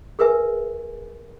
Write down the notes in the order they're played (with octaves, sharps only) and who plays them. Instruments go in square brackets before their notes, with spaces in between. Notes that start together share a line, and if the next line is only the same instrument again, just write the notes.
[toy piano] G#4 A#4 B4 E5 G#5